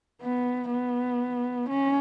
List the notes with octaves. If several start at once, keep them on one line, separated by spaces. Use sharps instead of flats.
B3
B3
C#4